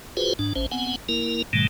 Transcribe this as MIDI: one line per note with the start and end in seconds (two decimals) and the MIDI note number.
0.17 0.33 65
0.17 0.33 66
0.17 0.33 68
0.17 0.33 71
0.17 0.33 72
0.39 0.53 44
0.39 0.53 62
0.56 0.66 33
0.56 0.66 61
0.56 0.66 72
0.72 0.96 59
0.72 0.96 60
0.72 0.96 78
0.72 0.96 80
1.09 1.42 58
1.09 1.42 64
1.09 1.42 70
1.53 1.67 44
1.53 1.67 47
1.53 1.67 51
1.53 1.67 55
1.53 1.67 57